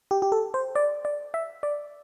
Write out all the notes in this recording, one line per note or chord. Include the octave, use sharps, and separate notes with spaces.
G4
G4
A4
C5
D5
D5
E5
D5